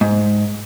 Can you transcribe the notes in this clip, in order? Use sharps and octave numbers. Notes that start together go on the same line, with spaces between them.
G#2